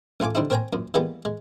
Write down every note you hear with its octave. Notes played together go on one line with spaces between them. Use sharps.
A1 A3 F4 G#5 D6
D3 G3 C4 D#4 E4
C4 A#4 C#5 G5 G#5 A#5
F#2 A#2
E3 G3 G#3 A#3 B3 G4
G#3